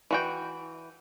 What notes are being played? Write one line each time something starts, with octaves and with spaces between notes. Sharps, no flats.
E3 F#4 G5